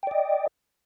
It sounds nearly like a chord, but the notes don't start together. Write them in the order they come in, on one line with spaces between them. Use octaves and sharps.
G5 D5 D#5